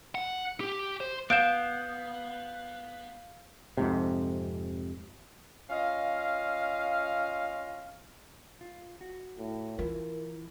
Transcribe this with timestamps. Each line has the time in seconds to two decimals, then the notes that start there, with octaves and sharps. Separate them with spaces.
0.15 F#5
0.60 G4
1.00 C5
1.30 B3 F5 G6 D7 E7
3.77 F2 G#2 C3
5.70 C#4 F4 D#5 F5
8.61 F4
9.01 F#4
9.38 A2
9.79 E3 F4 A#4